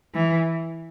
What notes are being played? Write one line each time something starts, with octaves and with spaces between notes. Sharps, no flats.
E3